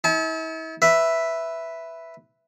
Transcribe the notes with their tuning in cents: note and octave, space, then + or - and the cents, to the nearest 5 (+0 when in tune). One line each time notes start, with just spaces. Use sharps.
E4 -45 A5 -40
B4 +0 E5 +0